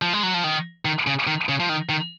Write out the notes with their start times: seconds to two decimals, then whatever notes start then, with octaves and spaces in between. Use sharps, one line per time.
0.02 F3
0.13 G#3
0.23 F#3
0.34 F3
0.44 D#3
0.85 D#3
1.07 C#3
1.27 D#3
1.49 C#3
1.60 F3
1.69 D#3
1.89 D#3